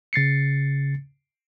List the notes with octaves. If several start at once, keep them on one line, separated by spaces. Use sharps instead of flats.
C#3 A6 C7 C#7